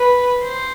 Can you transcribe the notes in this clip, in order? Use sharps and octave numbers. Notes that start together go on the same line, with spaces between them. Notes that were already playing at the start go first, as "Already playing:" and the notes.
Already playing: B4
C5